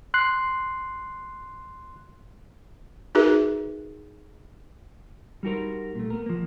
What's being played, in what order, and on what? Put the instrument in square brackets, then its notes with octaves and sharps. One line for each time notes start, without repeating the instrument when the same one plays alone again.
[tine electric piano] C6 F#6 C7
[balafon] D#4 F#4 G#4 A#4 B4 E5
[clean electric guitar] G3 D#4 F#4 G4 A#4 C5
A#2 A3
B3 A#4
F3 A#3